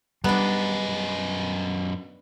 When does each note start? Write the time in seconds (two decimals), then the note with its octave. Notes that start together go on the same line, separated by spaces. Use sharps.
0.24 F#2 G3 B3 D4 D#5